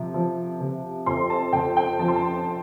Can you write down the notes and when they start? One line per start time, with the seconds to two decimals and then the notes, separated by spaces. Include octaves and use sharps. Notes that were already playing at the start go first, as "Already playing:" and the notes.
Already playing: C3 F3
0.14 F3
0.61 C3
1.06 F2 C6
1.30 A5
1.53 F2 G5
1.77 G5
1.99 F3 A5
2.08 C6
2.16 A5